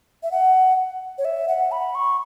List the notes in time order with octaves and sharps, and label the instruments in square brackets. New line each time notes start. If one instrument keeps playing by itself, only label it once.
[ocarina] E5
F#5
C#5
E5
F#5
B5
C#6